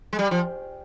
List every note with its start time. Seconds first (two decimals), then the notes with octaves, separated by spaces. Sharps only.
0.13 G#3
0.19 G3
0.31 F3